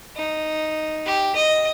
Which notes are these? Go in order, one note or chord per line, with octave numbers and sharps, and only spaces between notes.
D#4
G4
D#5